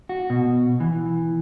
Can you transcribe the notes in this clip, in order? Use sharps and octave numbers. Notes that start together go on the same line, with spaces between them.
F#4
B2
E3